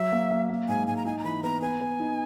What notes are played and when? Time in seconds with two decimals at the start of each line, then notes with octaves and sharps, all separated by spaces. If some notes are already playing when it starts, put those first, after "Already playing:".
Already playing: F#3 E5
0.12 A#3
0.31 A#3
0.50 A#3
0.68 G#2 G#5
0.87 G#2 G#5
0.97 A#5
1.05 D#4 G#5
1.19 A#5
1.24 E3 B5
1.43 B3 A#5
1.62 B3 G#5
1.81 B3
2.00 D#4